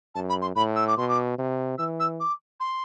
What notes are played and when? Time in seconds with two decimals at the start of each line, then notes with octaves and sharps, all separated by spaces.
0.15 F#2 A5
0.29 B5
0.42 C6
0.56 A2 B5
0.76 E6
0.88 D6
0.97 B2 C6
1.09 D6
1.38 C3
1.78 E3 E6
2.00 E6
2.20 D6
2.60 C6